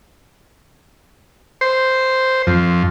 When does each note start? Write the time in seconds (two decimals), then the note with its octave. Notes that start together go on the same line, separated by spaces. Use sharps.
1.61 C5
2.47 F2